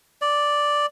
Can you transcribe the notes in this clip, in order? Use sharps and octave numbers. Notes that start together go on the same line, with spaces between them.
D5